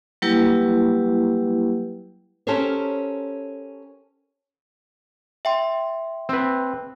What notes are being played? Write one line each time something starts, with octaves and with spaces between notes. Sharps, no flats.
F#3 G3 A#3 E4 G4 B4
C#4 G4 A4 A#4 C5 C#5
E5 G5 C6
C4 B4